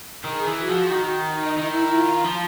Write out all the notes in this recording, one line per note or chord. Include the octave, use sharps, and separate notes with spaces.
D#3 G#4
E3
F#4
F3
D#3
D#4
D#3 E4
F4
F3